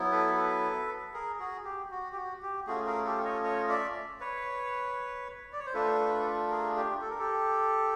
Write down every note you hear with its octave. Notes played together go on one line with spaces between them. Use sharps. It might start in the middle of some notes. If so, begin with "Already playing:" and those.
Already playing: F#3 B3 E4
A4 B4
A4 B4
G#4 A#4
F#4 G#4
G4
F#4
G4
F#4
G4
A3 C#4 F4 F#4 G#4
G#4 A#4
G4 A4
C#5 D#5
C#5 D#5
D5 E5
B4 C#5
D5
C#5
C5
A3 D4 F4 A4 B4
G#4 A#4
G4
A4
A#4
G4 A4